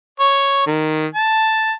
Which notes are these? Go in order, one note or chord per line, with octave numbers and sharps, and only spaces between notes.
C#5
D#3
A5